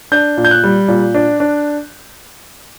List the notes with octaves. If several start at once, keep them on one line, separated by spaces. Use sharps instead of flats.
D4 G6
A#2
G6
F#6
G3
A#2
D4
D4